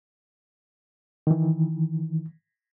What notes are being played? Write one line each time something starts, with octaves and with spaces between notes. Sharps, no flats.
D#3 E3